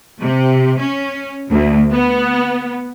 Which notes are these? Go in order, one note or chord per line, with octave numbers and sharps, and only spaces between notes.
C3
C#4
D2
B3